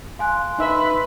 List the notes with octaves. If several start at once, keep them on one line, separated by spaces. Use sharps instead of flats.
F5 G#5 C6 F#6
D#4 B4 E5